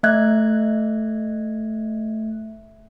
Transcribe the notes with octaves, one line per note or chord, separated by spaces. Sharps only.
A3 E5 F#6 G#6